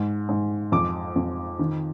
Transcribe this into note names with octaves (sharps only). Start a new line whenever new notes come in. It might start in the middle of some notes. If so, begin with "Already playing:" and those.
Already playing: G#2
G#2
F2 D6
F2
D#3